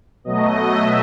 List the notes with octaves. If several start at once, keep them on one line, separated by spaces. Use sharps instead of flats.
B2 F#3 A3 D#5
E5